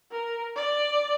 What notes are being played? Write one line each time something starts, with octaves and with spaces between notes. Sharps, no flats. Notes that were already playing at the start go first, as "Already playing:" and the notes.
A#4
D5